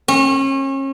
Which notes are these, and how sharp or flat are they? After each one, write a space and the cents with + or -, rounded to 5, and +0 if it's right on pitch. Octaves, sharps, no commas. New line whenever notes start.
C#4 -35